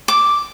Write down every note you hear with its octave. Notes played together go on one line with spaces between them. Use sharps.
D6